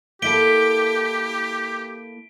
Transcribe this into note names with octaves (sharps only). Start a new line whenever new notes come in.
A#3 E4 G4 A4 B6 D7 G7